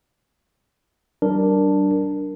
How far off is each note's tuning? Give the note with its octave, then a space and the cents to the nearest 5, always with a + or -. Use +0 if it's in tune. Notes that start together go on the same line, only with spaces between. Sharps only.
G3 -45 D4 +0 A#4 +0